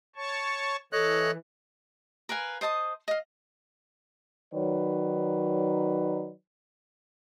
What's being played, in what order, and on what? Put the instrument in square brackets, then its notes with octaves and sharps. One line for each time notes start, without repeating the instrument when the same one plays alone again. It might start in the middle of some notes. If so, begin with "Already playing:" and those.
[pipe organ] C#5 A5 C#6
[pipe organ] E3 [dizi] A4 [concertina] C#5 D#5 F#6
[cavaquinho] A#4 B4 F5 G#5
C5 D#5 A5 D#6
D#5 F5
[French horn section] D#3 F#3 D#4 B4 C#5 D5